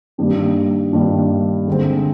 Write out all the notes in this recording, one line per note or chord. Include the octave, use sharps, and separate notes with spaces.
G2 D#3 G3 A#3 D4
G2 D#3 G3 A#3 D4
D3 G#3 C4